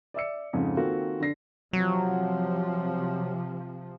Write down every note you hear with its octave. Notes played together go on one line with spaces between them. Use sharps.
D5 E5 E6 C#7
F2 G#2 C#3
D#3 A#3 C4 F4 F#4 A4
D3 D4 A#6 C7
C3 F3 F#3